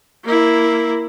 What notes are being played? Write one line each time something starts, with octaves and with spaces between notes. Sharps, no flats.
A#3 E4